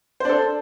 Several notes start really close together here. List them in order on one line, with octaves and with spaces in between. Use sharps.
C5 D4 A4